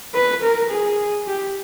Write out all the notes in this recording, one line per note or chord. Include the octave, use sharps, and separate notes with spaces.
B4
A#4
G#4
G4